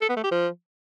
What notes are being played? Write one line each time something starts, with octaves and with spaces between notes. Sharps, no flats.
A4
B3
A3
G4
F3